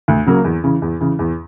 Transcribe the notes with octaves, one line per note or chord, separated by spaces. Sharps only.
D2
C#3 F#3 A#3
E2
C#3 E3
E2
C#3 E3
E2